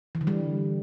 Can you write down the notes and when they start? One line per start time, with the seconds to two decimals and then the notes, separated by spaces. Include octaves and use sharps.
0.15 E3
0.21 D3
0.27 G3